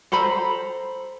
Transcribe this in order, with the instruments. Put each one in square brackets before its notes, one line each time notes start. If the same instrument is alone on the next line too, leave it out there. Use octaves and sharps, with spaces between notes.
[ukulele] A4 C5 A#5 B5